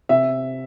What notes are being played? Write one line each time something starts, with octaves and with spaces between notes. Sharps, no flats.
C3 E5